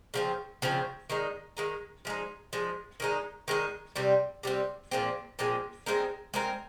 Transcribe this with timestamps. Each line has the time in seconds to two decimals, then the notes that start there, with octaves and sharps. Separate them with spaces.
0.14 C#3 F3 C4
0.62 C#3 F3 C4
1.10 D#3 G#3 D#4
1.57 D#3 G#3 D#4
2.05 F3 G#3 D#4
2.53 F3 G#3 D#4
3.00 D#3 G#3 D#4
3.48 D#3 G#3 D#4
3.96 C3 G3 C4
4.43 C3 G3 C4
4.91 A#2 F3 G#3 C4
5.39 A#2 F3 G#3 C4
5.86 G#3 C4 D#4 A#4
6.34 G#3 C4 D#4 A#4